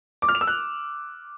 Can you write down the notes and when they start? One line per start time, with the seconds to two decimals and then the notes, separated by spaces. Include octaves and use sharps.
0.22 D6
0.29 F6
0.35 F7
0.41 E6
0.47 F#6